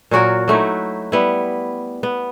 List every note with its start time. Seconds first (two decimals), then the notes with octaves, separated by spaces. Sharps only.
0.11 A#2 F#3 F#4 A#4
0.48 F#3 A3 D#4 E4
1.12 G3 B3 E4
2.03 B3